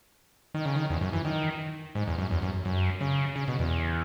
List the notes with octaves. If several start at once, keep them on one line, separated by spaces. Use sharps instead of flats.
D#3
C#3
D#3
E2
F#2
E3
D#3
G#2
E2
F#2
E2
F#2
F#2
C#3
C#3
B2
E2